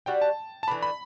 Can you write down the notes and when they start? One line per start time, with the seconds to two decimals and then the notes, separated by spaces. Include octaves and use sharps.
0.06 G3 D4 F#4 G5
0.22 A5
0.63 A5
0.68 E3 A3 D4 B5
0.82 B5